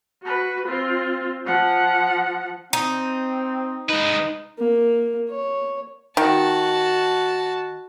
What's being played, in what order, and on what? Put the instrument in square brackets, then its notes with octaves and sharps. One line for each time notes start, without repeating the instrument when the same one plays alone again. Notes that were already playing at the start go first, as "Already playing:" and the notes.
[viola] F#4 B4
C4 F4
F3 F#5
[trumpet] C4 [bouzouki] D#4
[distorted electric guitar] G#3 B4 [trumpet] D#4
[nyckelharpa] A#3
C#5
[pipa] D#3 [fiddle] F#4 A5